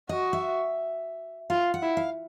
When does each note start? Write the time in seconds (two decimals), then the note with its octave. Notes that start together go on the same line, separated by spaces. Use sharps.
0.09 F#4 D#5
0.33 E5
1.50 F4 F5
1.74 F#5
1.82 E4
1.97 F5